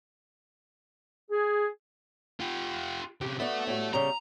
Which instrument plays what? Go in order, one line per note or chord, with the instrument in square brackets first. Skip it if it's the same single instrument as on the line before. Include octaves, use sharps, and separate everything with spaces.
[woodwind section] G#4
[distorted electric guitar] F4 G4
[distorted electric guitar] C3 C#4 [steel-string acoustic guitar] G4
[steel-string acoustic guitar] B3 D4 F#4 [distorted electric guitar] A4 E5
[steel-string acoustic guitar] A2 G3 F#4
[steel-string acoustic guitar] C#3 G3 [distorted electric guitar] A#5